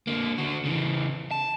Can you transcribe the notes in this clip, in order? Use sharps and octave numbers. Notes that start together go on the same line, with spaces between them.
D3 A#3
D3 F#4
C#3 E3
A5